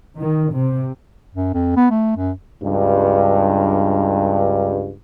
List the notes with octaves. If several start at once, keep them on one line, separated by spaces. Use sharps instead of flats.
D#3
C3
F#2
F2
B3
A3
F#2
C#2 G2